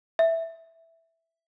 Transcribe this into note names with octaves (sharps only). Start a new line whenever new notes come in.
E5